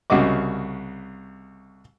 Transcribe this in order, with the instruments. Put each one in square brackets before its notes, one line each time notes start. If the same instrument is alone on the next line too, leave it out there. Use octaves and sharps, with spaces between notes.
[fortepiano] C2 C#3 F#4 D#5 D6